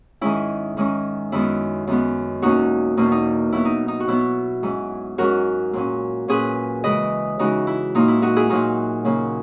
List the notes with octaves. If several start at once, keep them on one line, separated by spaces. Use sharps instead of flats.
G#2 D#3 G#3 C#4 E4
G#2 D#3 G#3 C#4
F#2 D#3 G#3 B3 E4
F#2 D#3 G#3 B3
E2 B2 A#3 C#4 D#4 F#4
E2 B2 A#3 C#4 D#4
D#4
B2 F#3 B3 E4
D#4
D#4
F#4
B2 F#3 B3 E4
G#2 F#3 C#4
G#2 F#3 C#4 F#4 A#4
A#2 F#3 C#4
A#2 F#3 C#4 G#4 B4
C#3 E3 G#3 B4 D#5
C#3 E3 G#3 D#4 F#4
E4
A#2 F#3 A#3 D#4
E4
D#4 F#4
E4 G#4
A#2 F#3 A#3 D#4 F#4
C#3 F#3 A#3